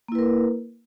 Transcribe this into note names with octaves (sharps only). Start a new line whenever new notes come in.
A#3 E4 A#4 B4